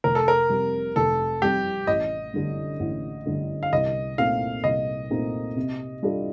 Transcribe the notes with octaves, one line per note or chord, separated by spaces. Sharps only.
F1 A#4
A4
A#4
F2 C3 G3
F1 A4
F2 C3 G3 G4
A1 D#5
G2 D3 A3
A1
G2 D3 A3
F5
C2 D#5
A#2 A3 C4 D#4 F5
C2 D#5
A#2 A3 C4 D#4
C3
G3 D4 F4 A4